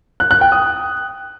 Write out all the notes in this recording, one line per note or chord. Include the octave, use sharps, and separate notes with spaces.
F#6
F#6
G5
D#6